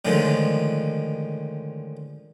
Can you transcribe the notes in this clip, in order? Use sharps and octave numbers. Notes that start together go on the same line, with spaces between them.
A2 D3 D#3 F3 G#3